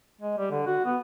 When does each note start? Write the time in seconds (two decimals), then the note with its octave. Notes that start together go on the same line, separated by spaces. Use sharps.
0.21 G#3
0.38 G3
0.52 D3
0.67 F#4
0.86 B3